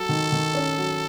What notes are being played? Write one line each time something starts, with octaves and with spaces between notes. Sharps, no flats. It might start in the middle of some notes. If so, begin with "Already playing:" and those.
Already playing: F#3 A4
D#3
D#3
C#4
F#3